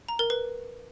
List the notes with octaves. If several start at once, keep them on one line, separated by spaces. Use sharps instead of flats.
A#5
A#4
B4